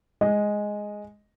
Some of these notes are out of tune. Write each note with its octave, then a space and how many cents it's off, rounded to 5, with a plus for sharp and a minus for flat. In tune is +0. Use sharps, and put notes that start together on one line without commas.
G#3 +0 D#5 +0